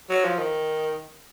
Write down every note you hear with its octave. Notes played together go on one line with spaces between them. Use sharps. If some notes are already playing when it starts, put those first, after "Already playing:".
F#3
F3
D#3